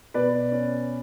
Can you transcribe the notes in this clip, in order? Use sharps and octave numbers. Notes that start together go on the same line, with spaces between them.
B2 B4 D5
C#4